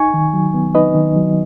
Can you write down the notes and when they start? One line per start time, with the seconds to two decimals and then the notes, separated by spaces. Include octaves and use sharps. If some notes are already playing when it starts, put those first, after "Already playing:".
Already playing: D#4 G#5 C#6
0.14 D#3
0.34 F#3
0.54 B3
0.75 D#4 B4 D#5
0.95 D#3
1.16 F#3